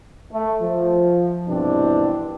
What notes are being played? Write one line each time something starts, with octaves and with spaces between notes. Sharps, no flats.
A3
F3
C2 G2 B2 E3 C4 D4